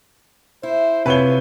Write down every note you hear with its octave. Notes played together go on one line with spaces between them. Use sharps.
E4 C5
C3 F4 B4 C#5 G7